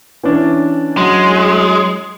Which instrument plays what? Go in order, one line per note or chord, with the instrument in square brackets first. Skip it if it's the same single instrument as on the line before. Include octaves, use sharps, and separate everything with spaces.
[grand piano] E3 C#4 D4
[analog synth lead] F#3 [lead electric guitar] G#3